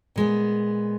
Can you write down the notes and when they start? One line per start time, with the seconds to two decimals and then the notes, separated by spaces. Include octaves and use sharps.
0.16 A#2 G#3 B3